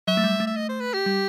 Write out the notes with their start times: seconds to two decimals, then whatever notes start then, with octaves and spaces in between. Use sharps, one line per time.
0.08 F#3 E5
0.17 A3
0.24 G3
0.40 A3
0.47 E5
0.56 D#5
0.69 C5
0.81 B4
0.94 G4
1.06 G3